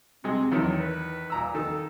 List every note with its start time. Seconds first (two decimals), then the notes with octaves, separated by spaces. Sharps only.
0.24 C3 G#3 C4
0.52 E2 D#3 F#3 E4
0.79 B4
1.30 A#2 A#5 E6
1.55 D#3 A4